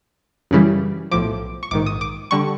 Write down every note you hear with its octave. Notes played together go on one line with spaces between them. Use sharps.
F#2 C#3 E3 G3
B1 A2 F3 D6
C#6
A#1 G#2 D#3 D6
D#6
D6
D3 G3 C#6